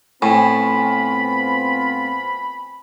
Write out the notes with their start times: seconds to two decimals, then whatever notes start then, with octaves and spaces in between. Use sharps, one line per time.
0.22 A2 B3 C4 F4 G5 G#5 B5 C#6